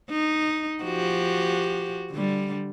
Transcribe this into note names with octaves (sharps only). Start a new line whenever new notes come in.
D#4
F3 F#4 G4
D3 G3